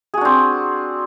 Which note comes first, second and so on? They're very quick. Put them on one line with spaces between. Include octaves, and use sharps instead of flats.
G#4 F#4 D4 C4